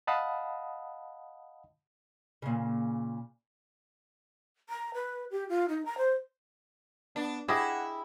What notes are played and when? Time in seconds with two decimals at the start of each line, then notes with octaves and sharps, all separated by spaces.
0.07 D#5 F5 F#5 A5 B5 D#6
2.42 A#2 C#3
4.69 A#5
4.94 B4
5.31 G4
5.49 F4
5.69 D#4
5.86 A#5
5.98 C5
7.16 B3 D4
7.48 E4 G4 G#4 D#5 F#5